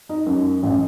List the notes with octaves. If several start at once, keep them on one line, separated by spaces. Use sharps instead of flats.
D#4
F#2
A1